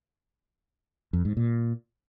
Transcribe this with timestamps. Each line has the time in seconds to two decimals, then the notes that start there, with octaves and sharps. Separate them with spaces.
1.13 F2
1.25 G#2
1.37 A#2